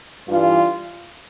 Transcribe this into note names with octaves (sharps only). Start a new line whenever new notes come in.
G2 E3 G3 F4